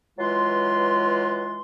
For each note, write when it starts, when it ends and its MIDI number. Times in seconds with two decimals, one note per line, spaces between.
0.19 1.61 52
0.19 1.61 54
0.19 1.61 56
0.19 1.61 65
0.19 1.61 71
0.19 1.61 84